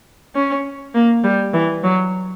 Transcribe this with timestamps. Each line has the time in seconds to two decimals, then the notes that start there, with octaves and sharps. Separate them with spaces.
0.35 C#4
0.94 A#3
1.24 G3
1.54 E3
1.84 F#3